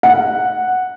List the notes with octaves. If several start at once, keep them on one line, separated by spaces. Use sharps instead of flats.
F#5